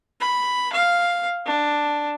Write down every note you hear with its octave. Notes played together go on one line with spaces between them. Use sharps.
B5
F5
D4